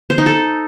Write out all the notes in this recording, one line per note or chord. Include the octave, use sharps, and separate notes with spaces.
C5
D#4
A4